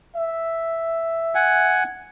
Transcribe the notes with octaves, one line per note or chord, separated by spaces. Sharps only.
E5
F#5 G#5